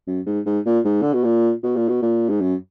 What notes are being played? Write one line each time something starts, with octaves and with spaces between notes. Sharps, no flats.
F#2
G#2
G#2
A#2
G#2
D3
B2
A#2
B2
A#2
B2
A#2
G#2
F#2